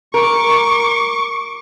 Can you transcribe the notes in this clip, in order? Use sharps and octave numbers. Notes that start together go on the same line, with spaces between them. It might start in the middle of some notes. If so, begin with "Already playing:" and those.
A#4 C#6 D6